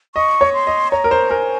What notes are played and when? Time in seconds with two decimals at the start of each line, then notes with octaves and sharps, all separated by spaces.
0.15 D#5 C#6
0.41 C#5
0.54 C6
0.67 D#5
0.92 C#5 A#5
1.04 A#4
1.11 C5
1.30 A#4 G#5